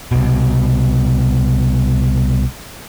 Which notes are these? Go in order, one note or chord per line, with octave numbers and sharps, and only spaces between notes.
C2 B2